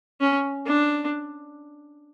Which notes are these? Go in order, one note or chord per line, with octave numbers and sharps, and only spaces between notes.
C#4
D4